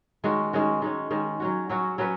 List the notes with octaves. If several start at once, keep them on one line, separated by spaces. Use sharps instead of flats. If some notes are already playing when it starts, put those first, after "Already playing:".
D#3 G#3 C#4 F#4
D#3 G#3 C#4 F#4
D#3 G#3 C#4
D#3 G#3 C#4
F#3 C#4 F#4
F#3 C#4 F#4
F#3 C#4 F#4 B4